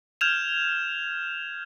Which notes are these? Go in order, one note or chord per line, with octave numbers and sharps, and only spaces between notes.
F6 G6 G#6 E7 F7